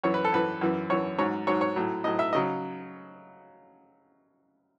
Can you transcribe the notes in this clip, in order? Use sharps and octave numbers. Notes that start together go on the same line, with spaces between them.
F#2 E3 C#5
B4
A4
F#2 E3 B4
F#2 E3
F#2 E3 C#5
G#2 F#3 C#5
G#2 F#3 C#5
C#5
A2 F#3
A2 F#3 D#5
E5
C#3 F#3 D#5